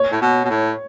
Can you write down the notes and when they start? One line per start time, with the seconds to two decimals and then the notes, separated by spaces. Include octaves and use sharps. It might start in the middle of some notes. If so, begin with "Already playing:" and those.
Already playing: C#5
0.12 A2
0.22 B2
0.44 B2
0.50 A2